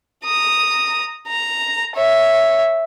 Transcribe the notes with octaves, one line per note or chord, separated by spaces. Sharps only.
A#5 D#6
A#5
C#5 E5